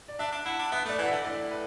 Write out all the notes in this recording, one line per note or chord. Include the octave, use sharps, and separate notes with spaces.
D5
D4 E5
D4
E4 F#5
D4
B3 E5
A3 D5
E3 F#5
D3 E5
A2 D5
B4